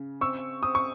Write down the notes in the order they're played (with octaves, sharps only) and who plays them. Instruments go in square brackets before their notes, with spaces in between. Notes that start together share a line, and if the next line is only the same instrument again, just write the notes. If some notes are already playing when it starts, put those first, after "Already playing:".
Already playing: [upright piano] C#3
C4 C#6 E6
C4 D#6
C#6